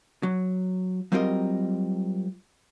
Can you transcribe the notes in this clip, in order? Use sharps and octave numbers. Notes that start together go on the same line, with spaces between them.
F#3
F#3 G3 C4 F4 A#4 D#5